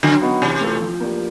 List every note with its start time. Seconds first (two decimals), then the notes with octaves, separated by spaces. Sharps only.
0.03 D3 F#3
0.22 B3 D#4 F#4
0.42 C3 E3
0.61 A3 C4 F4 A4
0.81 F3
1.00 A#3 D4 G4